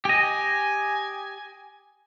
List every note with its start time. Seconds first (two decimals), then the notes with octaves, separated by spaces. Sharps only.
0.05 G4 D#5 G#5